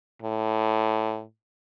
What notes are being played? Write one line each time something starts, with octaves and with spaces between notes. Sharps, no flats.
A2